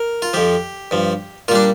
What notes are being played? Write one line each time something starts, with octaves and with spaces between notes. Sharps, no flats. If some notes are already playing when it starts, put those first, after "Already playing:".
Already playing: A#4
F4
F2 F3 G4
G2 F3
A#2 G3 D4 F4